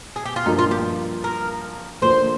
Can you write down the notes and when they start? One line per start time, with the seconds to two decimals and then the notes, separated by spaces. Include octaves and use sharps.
0.16 G#4
0.26 G4
0.36 F4
0.46 G2 F3 A#3 D#4
0.59 F4
0.71 G4
1.24 A#4
2.02 D#2 D3 F3 A#3 D4 C5